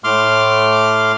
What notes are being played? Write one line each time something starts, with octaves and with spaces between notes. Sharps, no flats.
A2 A3 C6 D6 F6